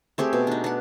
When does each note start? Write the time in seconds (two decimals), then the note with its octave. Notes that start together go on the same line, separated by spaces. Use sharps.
0.18 A3 C4 G4 G#4
0.33 B2
0.47 D4 D#4
0.64 D4 F#5